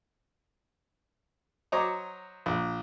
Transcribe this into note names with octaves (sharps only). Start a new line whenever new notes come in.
F#3 C5 C#5 D#5 A#5 D6
A#1